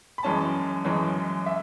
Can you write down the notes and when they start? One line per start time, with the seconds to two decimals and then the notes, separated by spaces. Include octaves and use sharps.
0.18 B5
0.23 F#2 E3 G#3 C#4 A5
0.85 F#2 E3 G#3 C#4
1.46 E5